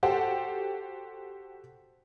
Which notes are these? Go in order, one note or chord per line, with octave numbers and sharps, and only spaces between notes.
F#4 G4 A4 C5 F#5